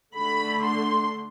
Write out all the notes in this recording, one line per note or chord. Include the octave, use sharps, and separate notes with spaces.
D3 A3 D4 B5
C6